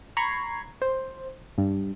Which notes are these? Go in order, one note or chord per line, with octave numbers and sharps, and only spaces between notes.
A#5 B5 C#6 G#6 C7
C5
G2